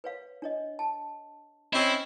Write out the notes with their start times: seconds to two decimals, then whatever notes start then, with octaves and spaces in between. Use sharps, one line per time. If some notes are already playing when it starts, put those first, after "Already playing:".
0.04 B4 C#5 F5
0.42 D4 C#5 D#5
0.79 A5
1.73 C4 C#4 E4 D#5